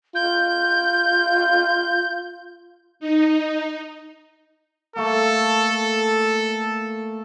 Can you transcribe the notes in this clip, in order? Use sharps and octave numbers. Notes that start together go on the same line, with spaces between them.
F4 G6
D#4
A3 A#3 A4